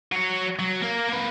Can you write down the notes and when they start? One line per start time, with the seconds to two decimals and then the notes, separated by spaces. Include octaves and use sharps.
0.12 F#3 C#5
0.59 F#3
0.82 A#3 A#4
1.09 A#3 B4